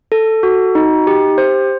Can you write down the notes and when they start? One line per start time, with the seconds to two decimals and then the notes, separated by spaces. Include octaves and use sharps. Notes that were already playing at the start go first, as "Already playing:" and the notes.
0.12 A4
0.43 F#4
0.75 D#4
1.07 G4
1.38 C5